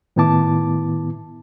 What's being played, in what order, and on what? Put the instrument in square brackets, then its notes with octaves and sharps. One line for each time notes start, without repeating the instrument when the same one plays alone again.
[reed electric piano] A2 D#3 B3 E4 A5 D6